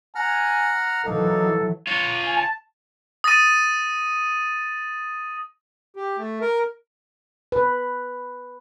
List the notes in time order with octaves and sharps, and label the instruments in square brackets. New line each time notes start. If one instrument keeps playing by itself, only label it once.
[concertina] F#5 A#5 F6 [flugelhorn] G#5
[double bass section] E3 F#3 [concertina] A#3 D#4 [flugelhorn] A4
[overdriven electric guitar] F4 C#5
[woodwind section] G#5
A5
[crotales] D#6 A6 A#6 D#7
[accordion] G4
A3
A#4
[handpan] B4